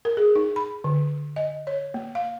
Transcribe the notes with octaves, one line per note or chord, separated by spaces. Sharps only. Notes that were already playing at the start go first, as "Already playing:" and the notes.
A#4
G#4
D#4
B5
D3
D#5
C#5
A#3
F5